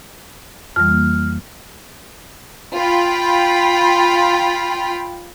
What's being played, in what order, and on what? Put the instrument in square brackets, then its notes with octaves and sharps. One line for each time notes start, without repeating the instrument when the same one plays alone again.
[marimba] F2 E3 G3 [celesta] F6
[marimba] A#3
[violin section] F4 G5 B5